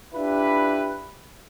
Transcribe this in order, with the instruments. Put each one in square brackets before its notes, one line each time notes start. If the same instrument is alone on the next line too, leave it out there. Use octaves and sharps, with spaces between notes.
[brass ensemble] D4 E4 F4 G4 B4